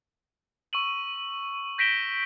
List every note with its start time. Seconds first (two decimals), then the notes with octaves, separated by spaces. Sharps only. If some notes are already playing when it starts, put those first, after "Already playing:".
0.73 C#6 E6 D#7 F#7
1.78 G6 A#6 B6 D7 E7 G7